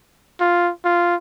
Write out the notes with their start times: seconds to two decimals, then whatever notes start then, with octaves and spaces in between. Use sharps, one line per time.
0.40 F4
0.84 F4